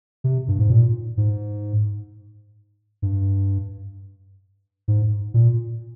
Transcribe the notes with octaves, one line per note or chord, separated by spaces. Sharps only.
C3
G2
G#2
A#2
G#2
G2
G#2
A#2